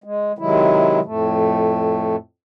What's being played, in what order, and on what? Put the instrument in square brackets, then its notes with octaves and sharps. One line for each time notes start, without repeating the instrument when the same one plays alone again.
[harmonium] G#3
C3 D#3 F#3 G#3 E4
F2 A2 A3